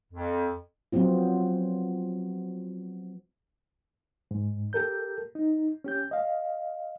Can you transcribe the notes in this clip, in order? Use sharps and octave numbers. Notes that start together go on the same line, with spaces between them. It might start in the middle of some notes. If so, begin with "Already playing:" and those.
F2
F3 F#3 B3 C4 F4
G#2
G4 A4 A#4 G6
D#4
C#4 G4 G6
D#5 F5